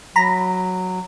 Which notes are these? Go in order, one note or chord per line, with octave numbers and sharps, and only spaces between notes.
F#3 A#5 B5